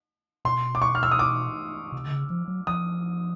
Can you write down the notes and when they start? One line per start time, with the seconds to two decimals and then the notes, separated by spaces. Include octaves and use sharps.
0.45 B2 C6
0.75 D6
0.82 C#6
0.95 F6
1.03 E6
1.12 D#6
1.19 D6
1.92 C3
2.06 D3
2.11 C#3
2.30 F3
2.48 F#3
2.67 F3 D#6